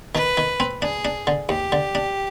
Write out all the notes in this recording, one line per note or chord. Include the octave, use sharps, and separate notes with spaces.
D#3 B4
D#3
C4
D4 G#4
D4
D3
D#2 G4
D3
D4